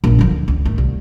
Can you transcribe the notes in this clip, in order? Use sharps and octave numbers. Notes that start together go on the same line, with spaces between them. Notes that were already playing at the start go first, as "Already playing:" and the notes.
A#1 G#2
D3 F3
C#2
C#2
G#1 A3
C2